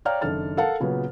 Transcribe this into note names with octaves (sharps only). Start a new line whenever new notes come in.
C#5 D5 F5 G5 A#5 F6
F#1 D#3 D4 A4 F6 A6
A4 A#4 F5 F#5 A5
A#2 C#3 F#3 B3